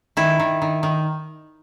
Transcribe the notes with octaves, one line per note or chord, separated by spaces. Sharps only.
D#3 E4
D#3
D#3
D#3